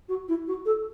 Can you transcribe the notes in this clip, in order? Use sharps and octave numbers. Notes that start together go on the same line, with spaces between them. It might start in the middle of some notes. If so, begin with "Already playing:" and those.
F#4
E4
F#4
A4